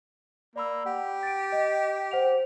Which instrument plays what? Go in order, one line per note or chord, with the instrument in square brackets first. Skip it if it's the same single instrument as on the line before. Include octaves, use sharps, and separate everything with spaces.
[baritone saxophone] A#3 [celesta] D5 B5 E6
[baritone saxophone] G4 [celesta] F#5
[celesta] A6 D7
D#5
C5 F#5 F7